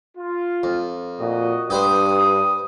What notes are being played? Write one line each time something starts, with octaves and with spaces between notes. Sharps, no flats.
F4
F2
A#2 F#4 D#5
G2 G4 B4 C5 D#6